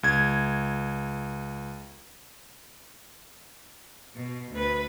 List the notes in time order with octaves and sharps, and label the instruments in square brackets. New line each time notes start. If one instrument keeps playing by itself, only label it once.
[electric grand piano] C#2 G#6
[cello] B2
D2 B4